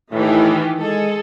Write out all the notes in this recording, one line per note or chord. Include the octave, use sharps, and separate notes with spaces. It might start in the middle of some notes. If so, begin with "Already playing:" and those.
A2 D#3 E3 G4
G#3 G#4 A4